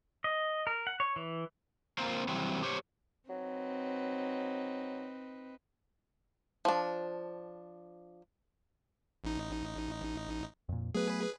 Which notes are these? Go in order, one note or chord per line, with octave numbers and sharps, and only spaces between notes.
D#5
A#4
F#5
C#5
E3
A#3 C4 F4 A#4 C5
E3 F#3 G3 C4
G4 C5 C#5
F#3 C4 D#4 B4
F3 D4
A1 D#4
F2 A#2
F#3 A3 B3 G#4 B4